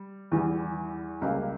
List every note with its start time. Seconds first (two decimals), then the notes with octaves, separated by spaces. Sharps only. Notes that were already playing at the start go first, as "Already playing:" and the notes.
Already playing: G3
0.32 E2 E3 G3
1.22 C#2 C#3 G3 A#3